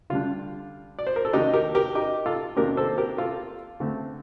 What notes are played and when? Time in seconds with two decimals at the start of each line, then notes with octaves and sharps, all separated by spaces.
0.10 D3 G3 D4 F4
0.99 D5
1.07 C5
1.16 A#4
1.25 A4
1.33 D#3 A#3 D4 D#4 G4
1.53 G4 A#4
1.75 G4 A#4
1.95 D#4 G4
2.26 F4 A4
2.57 C3 D#3 A#3 D4 G4 A#4
2.77 A4 C5
2.98 G4 A#4
3.18 F4 A4
3.80 D3 A3 C4